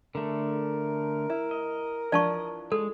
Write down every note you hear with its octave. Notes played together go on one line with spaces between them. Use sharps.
D3 A3 A#4
E4
D#5
E3 F3 D4 D5 A5 C#6
G#3 A4